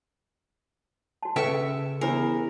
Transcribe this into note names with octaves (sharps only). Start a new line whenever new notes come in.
F#4 A5
C#3 C#4 A4 B4 E5 G5 C#6
E2 D4 G4 A#4 C5